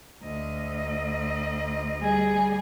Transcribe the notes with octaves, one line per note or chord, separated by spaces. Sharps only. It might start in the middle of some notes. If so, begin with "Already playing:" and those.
D2 D#5
G3 G#4